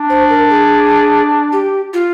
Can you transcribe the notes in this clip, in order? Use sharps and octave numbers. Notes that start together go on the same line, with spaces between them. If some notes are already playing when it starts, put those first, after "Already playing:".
Already playing: D4
C5
A#4
G#4
G4
F4